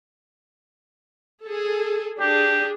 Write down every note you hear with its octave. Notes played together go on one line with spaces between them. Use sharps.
G#4 A4
D4 G4 G#4